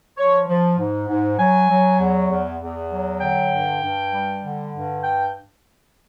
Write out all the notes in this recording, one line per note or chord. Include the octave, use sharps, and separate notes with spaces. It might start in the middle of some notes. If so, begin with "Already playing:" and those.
F3 C#5
F3
G#2
G#2
F#3 G#5
F#3
E2
E2
E2
F#3
D3 G5
G2
G2
G3
D3
G2
G5